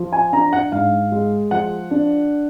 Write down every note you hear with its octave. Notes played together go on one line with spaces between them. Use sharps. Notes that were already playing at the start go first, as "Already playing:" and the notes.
Already playing: F3
G#5
D4 A#5
F#5
G#2 F5
G#3
F3 F#5
D4